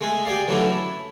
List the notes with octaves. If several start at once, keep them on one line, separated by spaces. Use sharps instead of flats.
G#3 A3 G#4
G4 G#4 D5 F5
D3 E3 F#3 A3 C#4 D4
E4